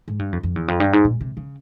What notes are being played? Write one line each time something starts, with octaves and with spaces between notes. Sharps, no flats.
G#2
G2
F2
F2
E2
F2
G2
G#2
A#2
C3
C#3